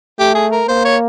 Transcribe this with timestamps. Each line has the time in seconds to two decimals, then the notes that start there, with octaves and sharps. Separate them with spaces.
0.19 A3 G4
0.35 G#4
0.52 A#4
0.68 A#3 C5
0.85 C#5